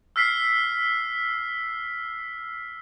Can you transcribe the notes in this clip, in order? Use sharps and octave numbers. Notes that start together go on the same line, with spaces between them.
E6 F6 B6 C7